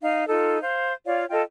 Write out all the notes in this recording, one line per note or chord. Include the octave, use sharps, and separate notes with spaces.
D#4 F5
D#4 F4 A4
C5 F5
F4 C#5 D5 F5
F4 A4 D#5 G5